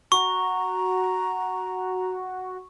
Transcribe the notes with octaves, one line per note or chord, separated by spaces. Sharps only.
F#4 A#5 C#6